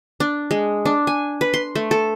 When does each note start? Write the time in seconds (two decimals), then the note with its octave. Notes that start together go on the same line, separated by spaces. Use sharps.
0.20 D4
0.51 G#3
0.86 D4
1.07 G#5
1.41 B4
1.54 C6
1.75 A3
1.91 A4